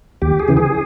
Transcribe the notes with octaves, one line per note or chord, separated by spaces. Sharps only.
D#2 G4
G#4
C#3 E3
G#4